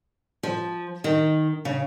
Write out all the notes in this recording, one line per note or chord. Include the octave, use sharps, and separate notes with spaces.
F3
D#3
C#3